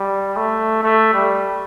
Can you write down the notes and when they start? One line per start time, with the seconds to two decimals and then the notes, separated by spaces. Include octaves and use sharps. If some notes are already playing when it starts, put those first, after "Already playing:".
Already playing: G3
0.37 A3
0.83 A3
1.14 G3